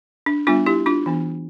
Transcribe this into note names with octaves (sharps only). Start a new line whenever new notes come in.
D4
G3 B3 D4 F4
E4 G4
D4 F4
E3 B3 D4